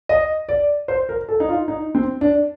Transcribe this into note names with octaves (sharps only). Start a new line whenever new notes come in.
D#5
D5
C5
A#4
A4
D#4
F4
D#4
C4
D4